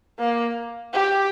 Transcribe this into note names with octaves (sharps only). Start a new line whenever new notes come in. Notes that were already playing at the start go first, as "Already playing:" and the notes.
A#3
G4